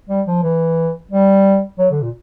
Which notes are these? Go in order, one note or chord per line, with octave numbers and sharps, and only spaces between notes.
G3
F3
E3
G3
F#3
D3
A#2